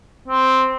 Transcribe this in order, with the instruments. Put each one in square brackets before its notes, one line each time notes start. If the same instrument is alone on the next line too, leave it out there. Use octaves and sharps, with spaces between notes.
[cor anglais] C4